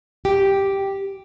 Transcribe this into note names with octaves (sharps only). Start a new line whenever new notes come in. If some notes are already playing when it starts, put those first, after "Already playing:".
G4